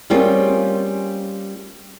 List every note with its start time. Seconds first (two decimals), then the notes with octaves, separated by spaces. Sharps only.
0.10 G3 A#3 C4 C#4 F4 G#4